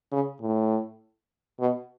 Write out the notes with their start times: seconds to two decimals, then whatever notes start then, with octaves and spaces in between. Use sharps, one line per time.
0.12 C#3
0.41 A2
1.60 B2